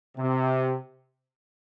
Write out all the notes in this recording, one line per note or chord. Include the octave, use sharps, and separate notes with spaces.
C3